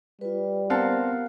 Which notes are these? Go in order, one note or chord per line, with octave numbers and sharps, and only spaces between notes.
G3 F4 B4
B3 C4 A#4 F5 F#5 A5